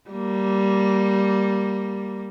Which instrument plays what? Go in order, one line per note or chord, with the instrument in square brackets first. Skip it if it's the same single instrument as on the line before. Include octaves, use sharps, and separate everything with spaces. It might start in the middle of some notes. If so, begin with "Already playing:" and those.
[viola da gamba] G3 A#3